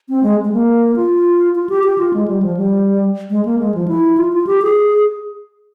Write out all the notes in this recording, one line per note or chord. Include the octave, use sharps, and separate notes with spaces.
C4
G#3
G#3
A#3
F4
F4
G4
G4
F4
G#3
G3
F3
G3
G#3
A#3
G#3
F3
E4
F4
F4
G4
G#4